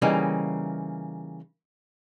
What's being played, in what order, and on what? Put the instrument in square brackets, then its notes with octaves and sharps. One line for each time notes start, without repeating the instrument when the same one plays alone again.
[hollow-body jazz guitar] C#3 E3 G3 A#3 D#4